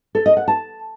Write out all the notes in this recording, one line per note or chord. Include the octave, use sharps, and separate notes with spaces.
A4
D#5
F#5
A5